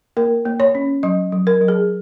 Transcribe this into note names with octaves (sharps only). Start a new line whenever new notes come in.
A#3 A#4
A#3
C#5
C#4
F#3 D#5
F#3
A#4
F#3
G#4